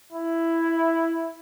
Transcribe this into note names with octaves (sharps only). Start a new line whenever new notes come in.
E4